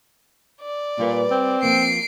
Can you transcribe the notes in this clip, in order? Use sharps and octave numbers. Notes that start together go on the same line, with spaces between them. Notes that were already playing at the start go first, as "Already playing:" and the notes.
D5
A#2 G3 B4
C4
F3 A#3 C7 D7